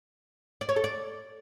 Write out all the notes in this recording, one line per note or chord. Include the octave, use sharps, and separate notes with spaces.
D5
C#5
A4
D5